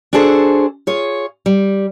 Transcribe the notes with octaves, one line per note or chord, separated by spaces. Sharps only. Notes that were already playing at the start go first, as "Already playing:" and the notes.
D4 F#4 G#4 A4 C5
F4 G#4 C#5
G3